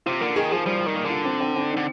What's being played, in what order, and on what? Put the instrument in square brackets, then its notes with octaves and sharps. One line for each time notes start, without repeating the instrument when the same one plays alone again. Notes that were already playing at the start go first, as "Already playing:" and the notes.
[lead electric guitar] C3 [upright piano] F4
[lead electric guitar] D3 [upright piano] A#3
[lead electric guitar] D#3 [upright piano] G#4
[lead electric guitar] F3 [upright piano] G#4
[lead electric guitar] F3 [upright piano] G3
[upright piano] G3
[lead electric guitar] D#3
[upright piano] A#3
[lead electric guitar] D3 [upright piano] F4
[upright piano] C4
C4
C4
D#4
[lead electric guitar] D3